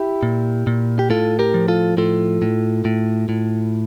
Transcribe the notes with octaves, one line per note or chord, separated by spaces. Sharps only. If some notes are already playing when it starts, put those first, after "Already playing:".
Already playing: E4 G4
A#2
A#2
G4
A2 F4 A4
G4 A#4
F3
F4 A4
A2 F4 A4
A2
A2
A2